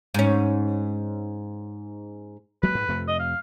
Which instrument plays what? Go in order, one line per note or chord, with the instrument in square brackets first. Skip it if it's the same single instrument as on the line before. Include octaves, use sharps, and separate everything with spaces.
[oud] G#2 C#4
[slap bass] F#3 G#3 A#3 [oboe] B4
[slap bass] G#2
F2 C3 A3
[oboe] D#5
F5